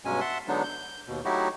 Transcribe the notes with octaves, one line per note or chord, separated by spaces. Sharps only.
G2 B2 F#3 G#3 C#4 G#5
E5 F#5 A5 C6
D3 F#3 G#3 B3 D4 D#4
G6
D#2 B2
F#3 A3 D#4 E4 F#4 G4